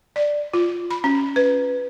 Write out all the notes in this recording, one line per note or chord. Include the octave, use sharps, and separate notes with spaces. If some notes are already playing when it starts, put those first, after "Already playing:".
D5
F4
B5
C#4
B4